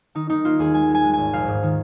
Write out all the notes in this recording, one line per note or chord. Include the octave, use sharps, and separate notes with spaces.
D#3 D#4
A#3 D#4
A#3 F4
D#2 G#4
G#3 G#5
G#3
G#5
G#3
G#1 G#5
A#1 F5
G#2
D#3